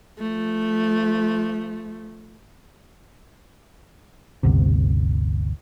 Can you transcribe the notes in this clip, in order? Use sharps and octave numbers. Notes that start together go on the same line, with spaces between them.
F3 A3
G1 D2 C3